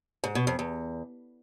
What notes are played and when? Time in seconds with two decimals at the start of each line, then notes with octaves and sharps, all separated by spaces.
0.24 G#2
0.35 B2
0.47 F2
0.59 E2